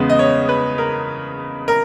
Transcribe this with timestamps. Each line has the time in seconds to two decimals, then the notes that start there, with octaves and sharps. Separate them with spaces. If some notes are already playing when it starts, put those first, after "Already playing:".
Already playing: E2 C#3 G#3 B3
0.09 D#5
0.19 C#5
0.49 B4
0.78 A#4
1.68 A#4